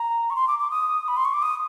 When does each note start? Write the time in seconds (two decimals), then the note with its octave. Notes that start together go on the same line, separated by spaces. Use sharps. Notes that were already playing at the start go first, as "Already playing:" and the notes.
Already playing: A#5
0.30 C#6
0.36 C6
0.48 D6
0.59 D6
0.71 D#6
1.08 B5
1.17 C6
1.25 C#6
1.34 D6
1.42 D#6